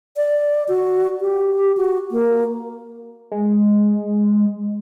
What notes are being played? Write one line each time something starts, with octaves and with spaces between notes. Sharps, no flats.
D5
F#4
G4
F#4
A#3
G#3